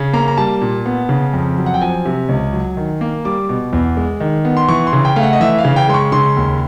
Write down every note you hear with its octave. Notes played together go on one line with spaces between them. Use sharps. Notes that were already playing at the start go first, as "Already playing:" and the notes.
Already playing: C#3
A#3 A#5
A#5
G3 A5
A#2
B3
C#3
F2
F#3
F#5
G5
F3 G#5
C3
C#2
F#3
D#3
A#3
G3 D6
B2
E2
G#3
D#3
B3
C6
E3 C#6
C6
C#3
G5
A3 F5
F#5
D#5
E3 E5
F5
C#3
G5
G#3 C6
C#6
C#3 C6
D#2